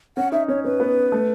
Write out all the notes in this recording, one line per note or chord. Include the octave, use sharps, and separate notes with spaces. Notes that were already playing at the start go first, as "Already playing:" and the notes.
C#4 F#5
D#4 E5
C#4 C#5
C#4 B4
B3
A3